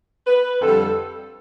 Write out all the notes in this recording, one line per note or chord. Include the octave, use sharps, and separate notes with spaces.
B4
F2 D3 G3 A4